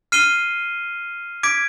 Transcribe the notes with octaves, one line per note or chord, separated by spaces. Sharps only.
F6 C7 D#7 G7
D6 G#6 B6 D7